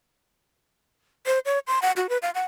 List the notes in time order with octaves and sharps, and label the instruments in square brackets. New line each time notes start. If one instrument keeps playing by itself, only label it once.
[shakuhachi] C5
C#5
C6
F#5
F#4
B4
F5
F#5